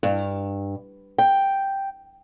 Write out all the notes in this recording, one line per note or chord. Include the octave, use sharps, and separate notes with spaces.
G2
G5